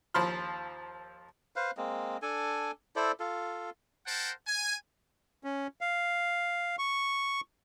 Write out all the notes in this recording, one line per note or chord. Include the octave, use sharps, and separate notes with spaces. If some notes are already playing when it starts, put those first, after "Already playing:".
D#2 F3 A5 B5 C6 F6
B4 C5 F5
G#3 A#3 C4
D4 A4 G#5
E4 A4 C5 D5
F4 A4
A#4 C5 F#5 G5 A5
G#5
C#4
F5
C#6